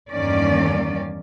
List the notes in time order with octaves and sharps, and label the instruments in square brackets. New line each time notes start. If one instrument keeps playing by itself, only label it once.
[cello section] E2 G2 D#3 A#3 C#4 D5